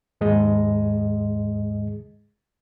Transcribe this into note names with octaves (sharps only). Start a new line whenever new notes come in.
D#2 G#2 G#3 G#4 D#5